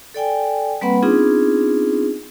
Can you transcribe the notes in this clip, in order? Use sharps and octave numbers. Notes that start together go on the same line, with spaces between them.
A4 D5 G5 G#5
G3 A#3 C4 B4 F#5 B5
B3 C4 D4 D#4 F4 G#4